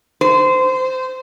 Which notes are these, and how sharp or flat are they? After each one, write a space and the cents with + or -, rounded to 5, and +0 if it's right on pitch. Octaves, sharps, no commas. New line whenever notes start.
C5 -20